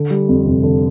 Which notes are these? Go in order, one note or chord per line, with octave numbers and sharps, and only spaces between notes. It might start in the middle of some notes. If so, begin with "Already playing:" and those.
Already playing: D3
G3
F2
F1
D3